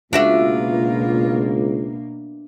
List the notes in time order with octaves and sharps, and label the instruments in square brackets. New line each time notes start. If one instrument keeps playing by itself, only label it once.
[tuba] C#2 [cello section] B2 A#3 [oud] D4 F#4 E5 [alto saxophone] F4